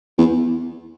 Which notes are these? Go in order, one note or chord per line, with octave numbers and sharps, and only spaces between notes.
E2